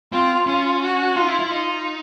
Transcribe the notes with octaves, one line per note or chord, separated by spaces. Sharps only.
C4 F4
C#4 F4
F#4
D#4 F4
E4
E4
D#4 F4